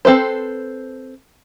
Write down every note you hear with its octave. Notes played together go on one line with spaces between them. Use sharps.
C4 A4 B4 C5